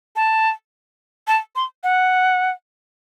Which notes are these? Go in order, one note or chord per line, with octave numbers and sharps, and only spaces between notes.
A5
A5
C6
F#5